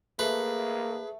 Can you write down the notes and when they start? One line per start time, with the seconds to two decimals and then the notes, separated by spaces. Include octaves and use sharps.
0.19 A3 A#3 G#4 B4